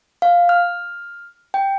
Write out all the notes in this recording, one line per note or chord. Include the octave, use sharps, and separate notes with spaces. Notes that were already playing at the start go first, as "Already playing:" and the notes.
F5
F6
G5